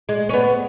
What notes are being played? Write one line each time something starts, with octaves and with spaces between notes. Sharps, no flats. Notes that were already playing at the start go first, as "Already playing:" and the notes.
G#3
C#4
B3